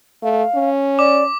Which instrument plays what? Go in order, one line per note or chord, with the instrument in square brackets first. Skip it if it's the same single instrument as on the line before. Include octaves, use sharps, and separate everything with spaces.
[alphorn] A3 [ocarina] F5
[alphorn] C#4
[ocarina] D5 [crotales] D6